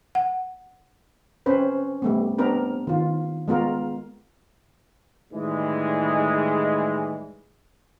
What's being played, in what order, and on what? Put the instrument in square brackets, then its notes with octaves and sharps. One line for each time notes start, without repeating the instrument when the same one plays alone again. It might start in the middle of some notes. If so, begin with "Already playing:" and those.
[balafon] F#5
[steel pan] C4 C#4 B4 C5
G3 A3 B3
B3 C4 D4 A#4 B4
D#3 F4
G#3 B3 F4 A#4
[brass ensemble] A2 D#3 E3 G3 G#3